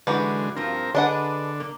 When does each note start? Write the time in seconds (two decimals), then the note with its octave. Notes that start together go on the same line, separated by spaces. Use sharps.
0.07 F#2 D3 E3 G#3 F#4 G4 B4
0.57 G2 F3 C4 A#4
0.95 D3 D4 G#4 B4 D#5 F#5
1.60 A#3